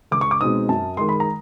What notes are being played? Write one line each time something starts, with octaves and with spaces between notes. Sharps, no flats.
C#2 D6
C#6
D6
B2 G#3 C4 D#4 D#6
F#2 A5
D#3 G#3 C6
B5
A#5